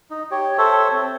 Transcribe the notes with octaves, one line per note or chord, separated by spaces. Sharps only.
D#4
G4 C#5
A4 C5 C#5 E5
C4